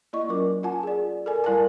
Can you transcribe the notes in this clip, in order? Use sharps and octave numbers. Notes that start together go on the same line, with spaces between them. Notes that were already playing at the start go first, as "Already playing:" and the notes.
A#3 E4 D5 D#5 C#6
F#3 C#4 F4 A#4 D6
F4 F#5 G#5 A5
G#4 D5
A4 A#4 D5 G#5
G3 E4 A#4 F5 G#5 A5